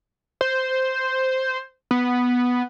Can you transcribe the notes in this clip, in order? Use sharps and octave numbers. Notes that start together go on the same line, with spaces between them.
C5
B3